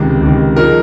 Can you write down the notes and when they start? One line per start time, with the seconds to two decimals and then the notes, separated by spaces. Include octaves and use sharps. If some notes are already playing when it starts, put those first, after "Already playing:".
Already playing: C#2 C3 D#3
0.21 C#2 C3 D#3
0.56 F3 G#3 D#4 A#4